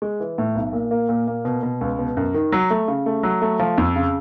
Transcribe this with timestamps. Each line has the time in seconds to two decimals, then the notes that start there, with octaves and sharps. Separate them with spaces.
0.02 G#3
0.20 E3
0.38 A2
0.55 B1
0.73 A#2
0.91 A#3
1.09 A#2
1.27 A#3
1.45 B2
1.63 B2
1.81 C#2
1.99 B2
2.17 F#2
2.34 D#3
2.52 F#3
2.70 A3
2.88 C#3
3.06 A3
3.23 F#3
3.42 A3
3.59 F3
3.78 F2
3.96 C#3